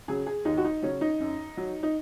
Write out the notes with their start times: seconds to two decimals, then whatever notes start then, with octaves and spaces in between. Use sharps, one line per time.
0.08 C#3 F#3 G#4
0.26 G#4
0.45 D#2 D#4
0.58 F#4
0.64 D#4
0.82 C#3 F#3 C#4
1.01 D#4
1.20 F#2
1.57 F#3
1.83 D#4